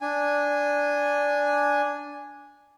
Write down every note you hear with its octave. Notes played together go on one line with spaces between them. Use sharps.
D4 G#5